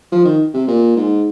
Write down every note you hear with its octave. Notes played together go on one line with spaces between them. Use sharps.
F3
D#3
C3
A#2
G#2